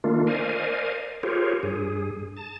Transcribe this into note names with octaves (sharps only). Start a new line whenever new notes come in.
D#3 A3 A#3 D4 F4
A#4 C5 D5 D#5 F5 G#5
F4 G4 G#4 A#4 C5 C#5
G2 G#4
A5